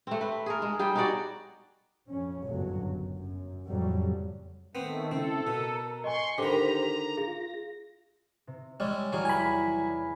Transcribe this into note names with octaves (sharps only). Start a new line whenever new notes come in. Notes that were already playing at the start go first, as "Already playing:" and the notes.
A3 C4
B4
G#4 A#4
G#3
G3 G#4 G5
D#4 F#4 D5
F2 C#4
G1 C#2 F#2 A2 F#3
F#2
F#2
F2 A2 C#3 F#3 G3
D#3 A3 B3 C4
C#3 C4 E4 A4
B2 A#4
D#5 G#5 C6 C#6
D3 D#3 G4 C5 A#5 B5 D6
F4 G#4 A#6
C3
G3 G#3 C#4 E6 A6
E3 F#3 G3 G#4 F6 D#7
E2 G#3 G#5 B5